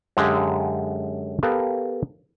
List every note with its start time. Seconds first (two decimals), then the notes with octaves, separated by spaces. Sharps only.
0.17 F#2 D3 G#3 G4 F5 A#5
1.43 B3 G4 A4 A#4 F5